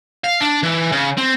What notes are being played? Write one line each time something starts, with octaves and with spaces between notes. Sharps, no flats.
F5
D4
E3
C#3
C4